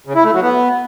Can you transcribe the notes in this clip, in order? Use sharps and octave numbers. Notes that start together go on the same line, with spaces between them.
C#3
E4
A3
F#3
B3